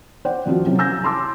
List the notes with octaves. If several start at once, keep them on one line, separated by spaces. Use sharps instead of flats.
C5 D5 F#5 G5
D#1 F3 C4 F4 F#4
C3 F#3 C#4 E4
G#5 E6 G6 A#6
A5 C6 D6 E6